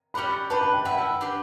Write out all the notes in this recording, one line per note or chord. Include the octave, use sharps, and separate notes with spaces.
C#4 G4 D5 F#5 B5
D4 G4 B4 A5
A5
G5
E4 B4 E5 F#5
G5
D4 G4 B4